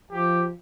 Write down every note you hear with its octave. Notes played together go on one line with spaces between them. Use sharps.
F3 G4